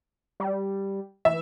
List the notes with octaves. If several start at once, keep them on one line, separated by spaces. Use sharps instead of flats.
G3
E3 E5